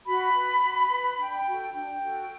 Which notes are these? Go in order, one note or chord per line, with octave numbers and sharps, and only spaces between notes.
F#4 B5
B4
F#4
B4
D4 G5
F#4 A4
D4 G5
F#4 A4